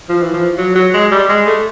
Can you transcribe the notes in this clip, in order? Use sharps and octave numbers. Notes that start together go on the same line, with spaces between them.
F3
E3
F3
F#3
F#3
G#3
G3
G#3
A3